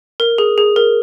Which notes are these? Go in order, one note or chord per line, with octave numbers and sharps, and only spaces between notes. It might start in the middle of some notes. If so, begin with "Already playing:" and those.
A#4
G#4
G#4
A#4